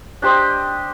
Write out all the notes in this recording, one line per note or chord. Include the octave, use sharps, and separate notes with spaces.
D4 G4 C5 D#5